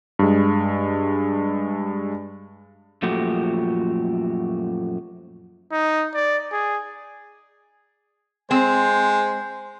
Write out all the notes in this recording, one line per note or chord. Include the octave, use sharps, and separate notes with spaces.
G2 G#3
F#2 A#2 F3 A3 F#4 G4
D#4
D5
G#4
G#3 C4 C5